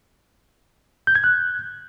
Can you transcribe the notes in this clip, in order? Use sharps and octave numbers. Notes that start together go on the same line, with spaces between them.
G6
G#6
F#6